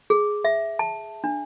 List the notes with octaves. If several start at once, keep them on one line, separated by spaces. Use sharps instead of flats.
G#4
E5
A5
D4